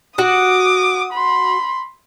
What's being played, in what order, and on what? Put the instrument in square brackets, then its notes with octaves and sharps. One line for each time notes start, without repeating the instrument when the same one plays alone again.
[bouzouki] F#4 F#5 [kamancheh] D6 D#6
[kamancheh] B5 C6